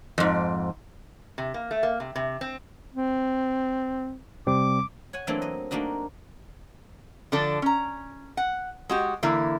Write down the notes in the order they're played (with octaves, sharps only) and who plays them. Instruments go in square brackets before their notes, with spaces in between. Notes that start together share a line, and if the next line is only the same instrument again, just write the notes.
[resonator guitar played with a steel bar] F2 G#2
C3
A#3
A3
A#3
C3
C3
C4
[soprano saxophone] C4
[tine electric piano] C3 G3 C4 [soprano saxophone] D6
[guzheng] C#5 F#5 G#5
E3 F#3 A3 A#3 C4 D4
D#5
A3 A#3 D4 D#4 F#4
[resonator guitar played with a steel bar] D3 F3 D4 A4
C#4 A#5
F#5
G#3 F#4 G4
D3 E3 A#3 E4